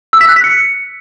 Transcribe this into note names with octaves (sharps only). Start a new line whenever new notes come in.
E6
B6
F#6
B6
C#7